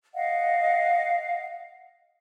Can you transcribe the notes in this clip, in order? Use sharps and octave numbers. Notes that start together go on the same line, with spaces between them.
D#5 F5 F#5